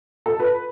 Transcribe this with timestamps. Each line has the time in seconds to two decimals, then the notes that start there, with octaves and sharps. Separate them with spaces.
0.26 A4
0.40 B4